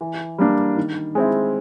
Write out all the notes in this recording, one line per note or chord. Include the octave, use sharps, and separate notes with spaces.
E3
G3 A#3 D4
D#3
G#3 C4 E4